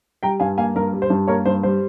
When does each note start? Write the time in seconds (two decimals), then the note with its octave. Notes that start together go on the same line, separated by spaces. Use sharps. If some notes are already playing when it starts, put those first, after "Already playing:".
0.23 G3 G5 A#5
0.40 G2 F5 G#5
0.58 A#3 F5 G#5
0.75 G2 A#4
0.93 G3
1.02 C5
1.10 G2
1.27 A#3 A#4 C#5
1.46 G2 C5
1.63 G3 C5